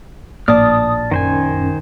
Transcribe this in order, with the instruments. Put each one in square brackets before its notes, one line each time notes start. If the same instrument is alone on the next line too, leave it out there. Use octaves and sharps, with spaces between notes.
[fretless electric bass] A#1 A2 A#3 [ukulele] D5 [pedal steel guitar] A5 F6 [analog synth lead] D#6
[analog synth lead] F#2 [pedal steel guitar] D#3 C5 G#5